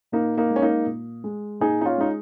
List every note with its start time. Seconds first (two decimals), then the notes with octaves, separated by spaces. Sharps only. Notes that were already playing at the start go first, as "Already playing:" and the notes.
0.12 A#2 A#3 D#4
0.37 A#3 D#4
0.50 G#3
0.56 C#4
0.62 A#3 D#4
0.86 A#2
1.24 G#3
1.60 A#2 D#4 G#4
1.81 D#4
1.85 C#4 F4
1.98 G#3 D#4